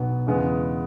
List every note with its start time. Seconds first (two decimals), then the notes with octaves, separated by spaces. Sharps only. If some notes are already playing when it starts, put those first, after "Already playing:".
Already playing: B1 B2 F#3 B3
0.27 E2 C#3 G#3 B3